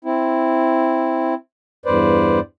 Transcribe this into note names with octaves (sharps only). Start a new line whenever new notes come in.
C4 E4
E2 G2 B4 C5 D5